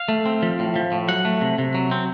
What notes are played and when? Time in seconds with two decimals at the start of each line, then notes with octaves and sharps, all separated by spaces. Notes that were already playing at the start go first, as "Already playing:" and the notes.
Already playing: F5
0.09 A3
0.26 C4
0.42 F3
0.59 A2
0.76 F3
0.92 A2
1.08 F#3 F#5
1.25 A3
1.41 C3
1.58 C3
1.74 F#3
1.91 C4